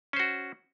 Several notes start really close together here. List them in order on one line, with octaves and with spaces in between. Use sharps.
C#4 C5 F#4